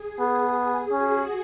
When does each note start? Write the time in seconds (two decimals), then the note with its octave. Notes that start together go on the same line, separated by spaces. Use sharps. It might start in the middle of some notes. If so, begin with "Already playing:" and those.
Already playing: G#4
0.20 B3
0.92 C#4 F#4